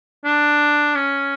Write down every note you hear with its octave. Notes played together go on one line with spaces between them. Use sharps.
D4
C#4